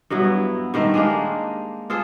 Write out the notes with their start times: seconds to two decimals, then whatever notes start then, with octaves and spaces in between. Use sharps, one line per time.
0.10 G2 F#3 B3 E4
0.74 G2 D#3 A3 C5
0.94 G#3 A#3 D4 G4
1.90 F4 G#4 A4 C5